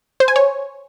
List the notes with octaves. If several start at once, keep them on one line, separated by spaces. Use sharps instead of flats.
C5
G#5
C#5